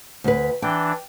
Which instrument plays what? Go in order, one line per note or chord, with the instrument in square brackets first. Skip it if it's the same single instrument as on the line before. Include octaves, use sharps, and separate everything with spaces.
[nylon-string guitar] D2 B4
[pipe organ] E3 D4 [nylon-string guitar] G5